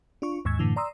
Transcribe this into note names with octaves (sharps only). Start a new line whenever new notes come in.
D4 F4 C#6
D#2 G#2 C#6 E6 G#6
F#2 A2 D3 E3
D5 A#5 C6 D#6 E6